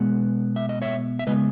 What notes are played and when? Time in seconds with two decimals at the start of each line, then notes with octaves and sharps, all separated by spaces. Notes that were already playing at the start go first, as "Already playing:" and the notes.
Already playing: B2 G#3 B3
0.56 E5
0.69 D#5
0.82 C#5 E5
1.19 E5
1.27 C#3 G#3 B3 B4 D#5